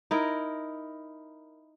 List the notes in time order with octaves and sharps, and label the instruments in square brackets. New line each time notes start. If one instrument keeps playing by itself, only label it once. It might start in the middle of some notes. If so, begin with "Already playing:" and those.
[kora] D#4 E4 A#4